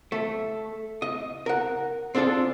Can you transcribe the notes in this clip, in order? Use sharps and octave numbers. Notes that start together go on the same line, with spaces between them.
A3
D#5
A#4 F#5
C4 D4 F4 G#4 A4